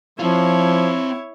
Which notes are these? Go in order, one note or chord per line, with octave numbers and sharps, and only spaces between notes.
F3 C4 E4 F4 C#5